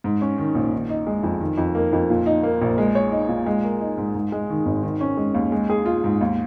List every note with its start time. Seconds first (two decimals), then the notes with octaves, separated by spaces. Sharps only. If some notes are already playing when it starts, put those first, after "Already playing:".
0.04 G#2
0.21 C#4
0.38 D#3
0.55 A#1
0.72 D#3
0.89 D#4
1.07 G#3
1.23 F2
1.41 D#3
1.58 F2
1.75 A#3
1.93 F2
2.10 A#2
2.26 D#4
2.43 A#3
2.61 A#1
2.78 G#3
2.95 C#5
3.12 D#4
3.29 A#2
3.46 G#3
3.64 A#4
3.81 D#4
3.98 G#2
4.14 G#2
4.32 G#3
4.50 D#3
4.66 G#1
4.83 D#3
5.01 C#4
5.17 G#3
5.34 D#2
5.52 G#3
5.70 G#4
5.86 F4
6.04 G#2
6.21 D#2